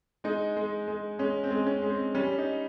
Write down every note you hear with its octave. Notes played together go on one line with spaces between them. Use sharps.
G#3 D#4
G#3
G#3
G#3 C#4
C4
G#3
C#4
G#3
C4
G3 C#4
D#4